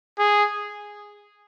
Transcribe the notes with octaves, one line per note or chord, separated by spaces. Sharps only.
G#4